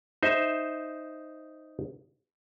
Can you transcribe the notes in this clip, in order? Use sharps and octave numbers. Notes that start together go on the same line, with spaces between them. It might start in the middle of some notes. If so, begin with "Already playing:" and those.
D#4 C5 E5